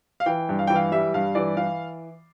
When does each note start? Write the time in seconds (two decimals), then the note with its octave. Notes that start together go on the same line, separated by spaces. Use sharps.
0.20 F5
0.26 E3 G5
0.49 G2
0.59 F5
0.67 E3 G5
0.76 F5
0.92 G3 E5
1.14 G2 F5
1.35 E3 D5
1.57 E3 F5